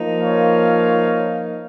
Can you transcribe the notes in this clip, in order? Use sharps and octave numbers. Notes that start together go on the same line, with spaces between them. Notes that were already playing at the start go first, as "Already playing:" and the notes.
Already playing: F3 A#3 D#4
C#5 F5